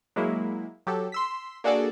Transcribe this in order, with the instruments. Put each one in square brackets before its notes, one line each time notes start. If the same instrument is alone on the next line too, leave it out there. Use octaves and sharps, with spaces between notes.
[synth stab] F#3 G#3 A#3 E4
F#3 G4 A4
C6 E6 B6
A#3 D4 F#4 G#4 A4 D5